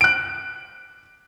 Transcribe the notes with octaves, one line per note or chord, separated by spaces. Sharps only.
F#6 D7